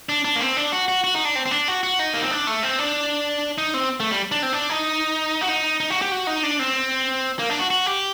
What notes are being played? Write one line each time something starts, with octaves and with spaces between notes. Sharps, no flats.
D4
D4
A#3
C4
D4
F#4
F#4
F#4
D#4
D4
C4
C4
D4
F#4
F#4
D#4
A#3
C4
D4
A3
C4
D4
D#4
C4
A3
G3
D4
C4
D4
D#4
F#4
D#4
D#4
F#4
G4
F#4
D#4
D4
C4
A#3
D4
F#4
F#4
G4